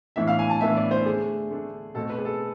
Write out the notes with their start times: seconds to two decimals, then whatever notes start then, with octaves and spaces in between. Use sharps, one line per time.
0.16 A2 E3 B3 D4 E5
0.27 F5
0.39 G#5
0.50 A5
0.61 A2 E3 B3 D4 E5
0.76 D5
0.91 C5
1.06 D3 A3 D4 G#4
1.50 D3 A3 D4
1.95 B2 A3 C4 A4
2.10 B4
2.18 G#4
2.25 A4